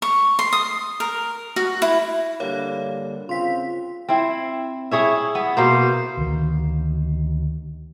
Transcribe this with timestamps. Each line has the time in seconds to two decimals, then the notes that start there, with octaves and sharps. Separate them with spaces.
0.02 C#6
0.39 C6
0.53 D#6
1.00 A#4
1.56 F#4
1.82 E4
2.40 D3 G3 A#3 C#5 F5
3.29 C#3 C4 F4 C6 B6
4.09 C4 E4
4.91 E4 G#4 C#5 E5
5.35 B3
5.57 B2 A#3 C5
6.17 D2 D#3